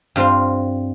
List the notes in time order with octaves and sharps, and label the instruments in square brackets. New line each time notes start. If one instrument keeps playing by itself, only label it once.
[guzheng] G2 G3 C4 F4